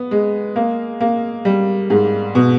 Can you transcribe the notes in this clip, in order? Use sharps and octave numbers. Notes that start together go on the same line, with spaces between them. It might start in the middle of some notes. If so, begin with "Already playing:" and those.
Already playing: B3
G#3
A#3
A#3
G3
G#2
B2